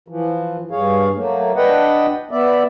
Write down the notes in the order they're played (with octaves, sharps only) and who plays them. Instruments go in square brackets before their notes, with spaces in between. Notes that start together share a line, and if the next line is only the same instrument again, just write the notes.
[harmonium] E3 F3
G2 G#4 C#5 F5
F#3 A3 A#3
D4 B4 D#5 F#5 G5
B3 D5 E5